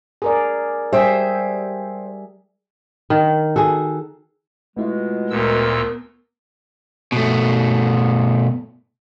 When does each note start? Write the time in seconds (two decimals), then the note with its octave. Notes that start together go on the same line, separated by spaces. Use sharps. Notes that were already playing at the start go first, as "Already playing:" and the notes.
0.22 G#4 A#4 D5
0.93 G3 G#4 C5 E5 G5
3.10 D#3
3.56 F#4 G#4 A4
4.77 B2 G#3 A3 E4 F4
5.31 D2 A#2 B3 A#4 E6
7.12 B2 A3